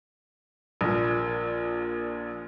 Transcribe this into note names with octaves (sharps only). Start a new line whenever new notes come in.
A#1 A#2